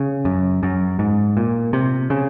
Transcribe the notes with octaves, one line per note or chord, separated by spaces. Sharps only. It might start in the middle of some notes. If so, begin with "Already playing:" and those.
Already playing: C#3
F#2
F#2
G#2
A#2
C3
C#3